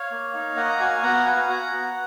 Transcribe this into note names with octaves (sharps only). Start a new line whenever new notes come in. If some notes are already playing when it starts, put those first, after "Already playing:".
Already playing: C#5 F5
A#3
D#4
A#3 D#5 F#5
A#5
F#4 F5 G#5
B3 F#5 A#5
F#4 F5 G#5
F#4 F#5 A#5
B3